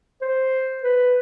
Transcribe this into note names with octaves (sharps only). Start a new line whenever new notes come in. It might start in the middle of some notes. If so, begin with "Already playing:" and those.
C5
B4